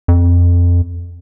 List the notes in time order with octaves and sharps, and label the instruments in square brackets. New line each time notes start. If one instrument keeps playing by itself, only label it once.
[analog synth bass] F2